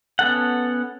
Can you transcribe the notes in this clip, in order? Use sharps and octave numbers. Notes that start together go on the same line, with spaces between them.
B3 C#4 A4 F#5